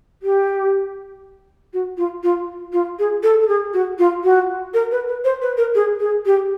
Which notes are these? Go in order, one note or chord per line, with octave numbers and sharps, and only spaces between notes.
G4
F#4
F4
F4
F4
G#4
A4
A4
G#4
F#4
F4
F#4
A#4
B4
B4
C5
B4
A#4
G#4
G#4
G4